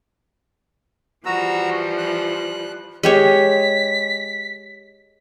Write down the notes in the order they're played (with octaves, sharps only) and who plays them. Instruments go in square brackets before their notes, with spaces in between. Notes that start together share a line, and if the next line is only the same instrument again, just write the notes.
[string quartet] E3 F3 G3 [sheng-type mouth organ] F#4 A#5 E6
[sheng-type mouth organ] F#6
[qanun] G#3 G4 C#5 [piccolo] B6